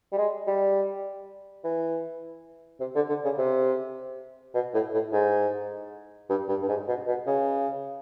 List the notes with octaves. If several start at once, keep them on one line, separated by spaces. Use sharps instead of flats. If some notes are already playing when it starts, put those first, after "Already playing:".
G3
G#3
G3
E3
C3
D3
D3
C#3
C3
B2
A2
A2
G#2
G2
G2
G2
G#2
B2
B2
C#3